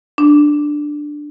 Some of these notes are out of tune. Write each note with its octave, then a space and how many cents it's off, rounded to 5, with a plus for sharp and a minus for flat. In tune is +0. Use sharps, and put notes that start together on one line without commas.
D4 +10